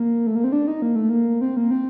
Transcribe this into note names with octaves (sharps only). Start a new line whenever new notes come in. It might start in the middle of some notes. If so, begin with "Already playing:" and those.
Already playing: A#3
A3
A#3
C4
D4
D#4
A#3
A3
A#3
C4
A#3
C4